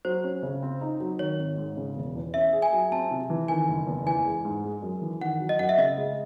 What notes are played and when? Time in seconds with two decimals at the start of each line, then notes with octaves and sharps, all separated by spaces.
0.05 F#3 C5
0.24 C#4
0.43 C#3
0.62 C4
0.81 D#4
1.00 F#3
1.19 D#3 C#5
1.38 G#1
1.58 G#2
1.77 C#3
1.96 E1
2.15 E2
2.34 C#4 E5
2.53 G#4
2.62 G#5
2.72 F#3
2.91 C4 A5
3.11 C3
3.30 E3
3.48 D#3 G#5
3.68 F#1
3.87 E2
4.06 E3 G#5
4.25 G#3
4.45 G#2
4.64 G#3
4.82 F#2
5.02 E3
5.21 D#3 F#5
5.40 F#3
5.49 D#5
5.59 F#2 F#5
5.69 E5
5.78 C#3 D#5
5.97 G#3